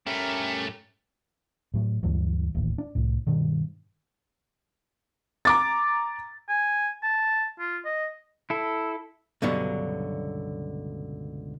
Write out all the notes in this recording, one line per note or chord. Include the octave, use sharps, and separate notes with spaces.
G2 A3 C#4 G4 A#4
A2 F#3
D2 G2 E3 F#3
D1 A1 D#2
D4
C2 A2
G2 B2 D#3
A#5 D6 A6
G#5
A5
F4
D#5
E4 A4
C#2 G2 B2 D3 F#3